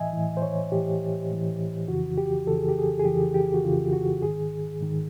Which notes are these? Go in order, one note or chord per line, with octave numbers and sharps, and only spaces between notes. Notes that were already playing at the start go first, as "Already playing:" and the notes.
Already playing: A2 E3 D#5 E5 G#5
A2 E3
C5
C#5
A2 E3 G4
A2 E3
F2 C#3 E3 F#4
G4
F2 C#3 E3 A4
G#4
G4
G#4
G#4
F2 C#3 E3 G4
G4
F#4
F2 C#3 E3 F4
F#4
G#2 D#3 G#4
G#2 D#3